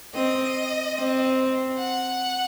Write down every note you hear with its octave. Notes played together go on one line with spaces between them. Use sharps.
C4 D#5
C4
F#5